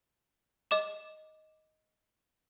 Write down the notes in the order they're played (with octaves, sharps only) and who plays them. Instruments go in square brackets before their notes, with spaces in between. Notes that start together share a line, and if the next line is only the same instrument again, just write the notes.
[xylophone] D#5 D6 E7